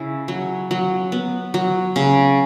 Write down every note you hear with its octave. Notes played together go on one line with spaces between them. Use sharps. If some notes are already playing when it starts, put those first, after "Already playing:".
Already playing: C#3 E4
F#3
F#3
B3
F#3
C#3